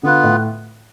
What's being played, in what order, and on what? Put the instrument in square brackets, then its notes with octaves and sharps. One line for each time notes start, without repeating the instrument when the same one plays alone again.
[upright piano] D3 [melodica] B3 F4 B4
[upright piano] A2